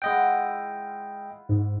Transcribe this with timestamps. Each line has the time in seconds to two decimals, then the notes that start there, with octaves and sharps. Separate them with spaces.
0.02 G#3 E4 F4 D#5 F#5 G5
1.49 G#2